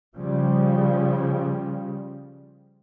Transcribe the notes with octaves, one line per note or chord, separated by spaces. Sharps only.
C#3 F3 G3